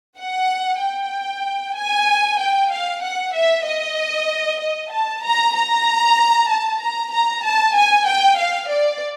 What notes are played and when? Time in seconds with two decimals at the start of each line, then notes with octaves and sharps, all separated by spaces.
0.19 F#5
0.81 G5
1.76 G#5
2.40 G5
2.71 F5
3.02 F#5
3.34 E5
3.66 D#5
4.60 D#5
4.91 A5
5.23 A#5
5.54 A#5
6.49 A5
6.80 A#5
7.12 A#5
7.44 A5
7.75 G#5
8.06 G5
8.38 F5
8.69 D5